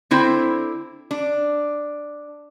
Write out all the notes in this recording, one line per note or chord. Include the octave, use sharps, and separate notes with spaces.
D3 C4 E4 C5
D4